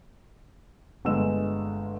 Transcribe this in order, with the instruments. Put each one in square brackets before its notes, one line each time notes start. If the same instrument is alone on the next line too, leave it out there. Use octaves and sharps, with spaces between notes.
[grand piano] G1 D3 G#3 A3 E6 E7